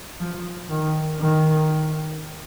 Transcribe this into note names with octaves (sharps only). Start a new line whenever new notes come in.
F3
D#3
D#3